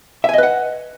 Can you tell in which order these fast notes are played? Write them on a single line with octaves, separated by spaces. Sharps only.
E5 G#5 D#5 B4 F#5